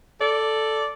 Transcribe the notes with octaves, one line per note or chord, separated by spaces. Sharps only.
A4 D5